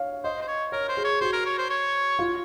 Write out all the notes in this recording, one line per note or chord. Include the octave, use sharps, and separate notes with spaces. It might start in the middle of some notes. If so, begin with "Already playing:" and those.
Already playing: C#5 F5
C5 D#5
C5
C#5
A#4 C#5
C5
G#4
C#5
F#4 C5
A#4
C#5
C5
C#5
F4